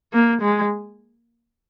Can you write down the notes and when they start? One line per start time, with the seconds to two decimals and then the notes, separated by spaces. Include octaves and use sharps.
0.14 A#3
0.42 G#3